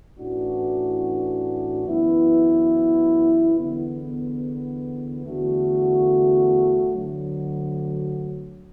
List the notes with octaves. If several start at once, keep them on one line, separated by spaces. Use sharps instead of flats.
A1 A2 E3 D4 F#4
F#2 E3 B3 E4
E2 D3 B3
E2 D3 A3 F#4
D2 D3 F#3